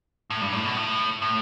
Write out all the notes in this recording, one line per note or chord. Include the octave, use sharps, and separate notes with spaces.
A2
G2
A2
B2
A2
A2